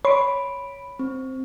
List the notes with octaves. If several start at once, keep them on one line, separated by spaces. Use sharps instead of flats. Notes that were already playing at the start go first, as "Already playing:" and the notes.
C#5 B5 C6 D7
C4